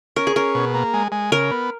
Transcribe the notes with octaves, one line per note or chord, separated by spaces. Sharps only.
C#4 A#4
G#4
C#4 A#4
B2
A#3
G#3
G#3
C#3 A#4
B3